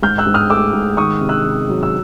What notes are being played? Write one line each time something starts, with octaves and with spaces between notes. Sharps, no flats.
G#2 F6 G6
E6 F#6
G#2
D#6 F6
A3 D6 E6
G#2
D#3 C#6 D#6
C3
E6 F#6
C3
F#3
E6